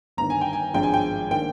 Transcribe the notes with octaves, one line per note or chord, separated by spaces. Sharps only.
G1 G2 D#3 A#5
G#5
G5
G#5
G#1 G2 F3 G#3 D4 G5
G#5
G5
D#3 A#3 D4 G5